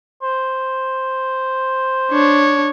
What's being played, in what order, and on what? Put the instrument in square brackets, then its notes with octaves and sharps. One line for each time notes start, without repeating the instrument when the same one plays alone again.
[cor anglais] C5
[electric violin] D4 C#5